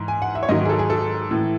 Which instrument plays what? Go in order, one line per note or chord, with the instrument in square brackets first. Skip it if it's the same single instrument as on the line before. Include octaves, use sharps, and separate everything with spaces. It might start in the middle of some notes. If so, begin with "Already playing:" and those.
Already playing: [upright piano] G#2 E3
G#5
F#5
E5
C#5
G#2 D#3 F#3 D#5
G#4
A4
G#4
A4
A2 E3